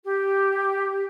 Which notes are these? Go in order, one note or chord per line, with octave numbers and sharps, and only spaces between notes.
G4